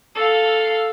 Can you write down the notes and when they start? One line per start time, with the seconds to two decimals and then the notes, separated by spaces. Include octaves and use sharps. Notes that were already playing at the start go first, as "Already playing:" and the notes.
0.16 A4 F5